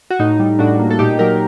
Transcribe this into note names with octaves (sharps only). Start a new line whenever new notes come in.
F#4
A2 D#4
G3
A2 D4 F#4
A#3
A4
A#2 D#4 G4
F#3 G4 A#4